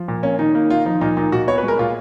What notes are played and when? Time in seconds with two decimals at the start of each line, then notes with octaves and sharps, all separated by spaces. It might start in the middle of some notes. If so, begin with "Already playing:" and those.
Already playing: F3
0.08 A#2
0.23 A#3 C#4
0.39 D#3 D#4
0.55 A#3 D#4
0.70 D#3 F4
0.86 F3 D#4
1.01 A#2 D#4
1.17 A#2 D#4
1.32 A#2 F#4
1.47 B3 C#5
1.58 B4
1.63 G#3
1.68 A#4
1.79 A#2 F4